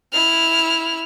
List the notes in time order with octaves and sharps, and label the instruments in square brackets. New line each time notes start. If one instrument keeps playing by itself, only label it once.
[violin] E4 F6